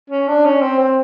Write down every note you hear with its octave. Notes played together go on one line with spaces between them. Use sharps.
C#4
D4
C#4
C4
C4